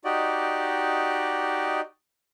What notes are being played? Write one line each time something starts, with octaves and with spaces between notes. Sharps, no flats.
D#4 F#4 G4 D5 D#5